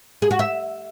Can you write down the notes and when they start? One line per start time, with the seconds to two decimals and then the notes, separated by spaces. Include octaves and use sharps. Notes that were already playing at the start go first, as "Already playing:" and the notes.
0.22 G#4
0.31 F#4
0.39 E5